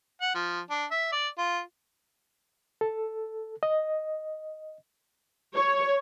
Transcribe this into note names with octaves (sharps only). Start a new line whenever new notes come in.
F#5
F3
D4
E5
D5
F4
A4
D#5
C#5